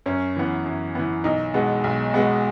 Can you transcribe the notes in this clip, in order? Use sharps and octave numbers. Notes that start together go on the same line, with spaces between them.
F#2 C#4
E3 B3
F#2
E3 B3
B1 D#4
B2 G#3 B3
B1
B2 G#3 B3